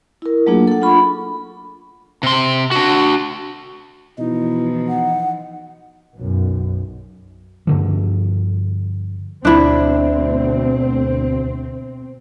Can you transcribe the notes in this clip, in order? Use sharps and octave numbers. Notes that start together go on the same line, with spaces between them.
E4 A#4
F#3 A3 A#3 D4 F4 G#4
A4 F#5
D4 F4 B5 C#6
C3 C6
D4 F#4
B2 E3 F3 D#4 E4
F#5
B1 F#2
G2 D3 F3
D2 B2 C4 D4 E4